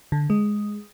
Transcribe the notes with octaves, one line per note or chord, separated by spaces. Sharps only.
D3
G#3